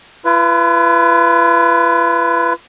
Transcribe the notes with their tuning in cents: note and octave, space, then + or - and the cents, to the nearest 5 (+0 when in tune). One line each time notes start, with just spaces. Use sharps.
F4 -45 B4 +0